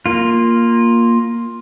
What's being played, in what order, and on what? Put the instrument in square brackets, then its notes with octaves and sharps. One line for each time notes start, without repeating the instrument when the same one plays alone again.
[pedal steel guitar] A#3 F4